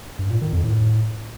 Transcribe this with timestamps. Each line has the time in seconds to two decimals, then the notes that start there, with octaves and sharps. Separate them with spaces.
0.19 G2
0.30 A#2
0.42 D#3
0.53 F2
0.64 A2